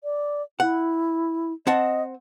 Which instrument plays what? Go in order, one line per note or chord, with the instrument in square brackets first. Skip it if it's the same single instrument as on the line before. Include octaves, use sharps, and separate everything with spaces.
[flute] D5
[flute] E4 [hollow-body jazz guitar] F#5
[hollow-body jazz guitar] C4 F#5 A5 [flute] D#5